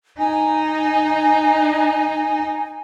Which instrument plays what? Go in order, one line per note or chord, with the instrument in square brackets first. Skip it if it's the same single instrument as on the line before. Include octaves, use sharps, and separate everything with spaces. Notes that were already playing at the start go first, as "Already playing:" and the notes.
[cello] D#4 [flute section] G#5